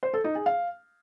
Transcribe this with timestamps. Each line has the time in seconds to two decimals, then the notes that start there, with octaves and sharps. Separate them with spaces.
0.03 C5
0.13 A4
0.24 D#4
0.35 G#4
0.46 F5